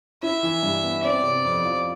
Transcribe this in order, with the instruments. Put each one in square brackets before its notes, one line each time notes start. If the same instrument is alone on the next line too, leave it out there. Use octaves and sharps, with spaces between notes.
[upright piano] E4 [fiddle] E5
[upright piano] E3
G2
B3
[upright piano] C4 [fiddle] D5
[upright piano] C3
F2
F3